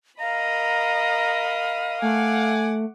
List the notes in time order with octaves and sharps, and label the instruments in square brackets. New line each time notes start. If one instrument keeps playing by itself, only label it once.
[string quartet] A#4 D#5 B5 [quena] F5 [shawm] A#5
[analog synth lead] A3 [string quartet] F#5 D6 [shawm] G#5